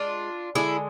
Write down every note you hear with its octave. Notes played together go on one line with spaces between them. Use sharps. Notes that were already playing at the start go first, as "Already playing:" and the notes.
Already playing: G#3 D4 F4
D3 G#3 E4 G#4